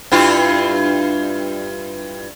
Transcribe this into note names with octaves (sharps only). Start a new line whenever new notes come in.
G2 E4 F4